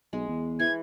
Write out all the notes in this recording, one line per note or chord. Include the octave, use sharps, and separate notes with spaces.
B1 G#3
E2
E3 G#6